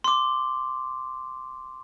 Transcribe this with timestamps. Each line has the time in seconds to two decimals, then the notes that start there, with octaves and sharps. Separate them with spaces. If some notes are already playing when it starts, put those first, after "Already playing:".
0.04 C6 D6